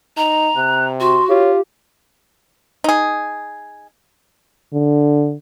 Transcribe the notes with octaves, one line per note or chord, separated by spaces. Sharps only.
D#4 A#5
C3 F#6
F#4 C6
F4 G4 C#5
D#4 G#4
D3